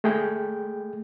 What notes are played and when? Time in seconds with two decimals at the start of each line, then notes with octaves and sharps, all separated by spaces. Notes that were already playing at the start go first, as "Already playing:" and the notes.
0.04 A3 G#4 G5